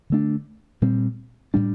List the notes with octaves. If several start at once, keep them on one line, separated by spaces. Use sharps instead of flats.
D3 A3 D4
A#2 G3 C4
A2 G3 D4